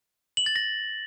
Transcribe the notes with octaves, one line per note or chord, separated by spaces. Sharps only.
F#7
A6
A#6